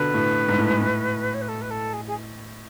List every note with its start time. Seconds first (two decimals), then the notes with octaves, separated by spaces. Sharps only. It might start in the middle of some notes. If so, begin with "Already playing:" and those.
Already playing: B2 D3 B4
0.14 A2
0.49 G#2
0.59 A2
0.70 G#2
0.81 A2
1.34 C#5
1.42 B4
1.49 A4
1.62 B4
1.71 A4
1.93 G#4
2.07 G#4